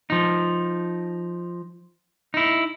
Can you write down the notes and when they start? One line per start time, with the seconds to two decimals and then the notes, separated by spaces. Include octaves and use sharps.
0.10 F3 D#4
2.34 D#4 E4